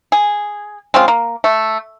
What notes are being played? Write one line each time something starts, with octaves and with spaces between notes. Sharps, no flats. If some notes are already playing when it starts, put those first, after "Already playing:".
G#4
G#3 C4 C#4 F4
A#3
A3